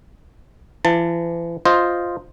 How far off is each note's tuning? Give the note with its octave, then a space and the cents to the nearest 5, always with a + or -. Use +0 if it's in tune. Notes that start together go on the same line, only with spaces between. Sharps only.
E3 +40 A5 +20
F4 +0 C5 +0 D#5 +0